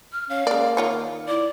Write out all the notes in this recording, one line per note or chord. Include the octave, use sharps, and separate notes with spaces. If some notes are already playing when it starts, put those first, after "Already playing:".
F6
C#4 F5
G#3 A#3 D5
D#3 F4 C#5
E4 D5